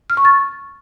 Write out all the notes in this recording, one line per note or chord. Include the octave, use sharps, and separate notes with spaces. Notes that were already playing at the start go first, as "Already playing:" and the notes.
F6
C#6
A6